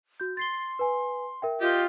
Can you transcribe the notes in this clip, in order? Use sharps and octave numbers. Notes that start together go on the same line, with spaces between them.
F#4 G6
C6 A6 C7 G7
B4 G#5
A#4 E5 G5
F4 G4 D#5